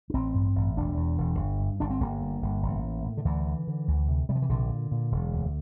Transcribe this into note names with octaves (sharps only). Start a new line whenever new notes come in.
D4
A1 C4
G2
A1
E1 D4
E2
E1
G1
G2
G1 D4
C4
G1 A#3
G2
G1
A1
A2
A2
D3
D2 E3
D3
D3
D2
C3
C3 G3
F3
E3
A#1 D3
A#2
A#2
E1
D2